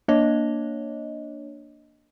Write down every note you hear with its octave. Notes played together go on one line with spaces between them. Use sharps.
A#3 D4 C#5 D#5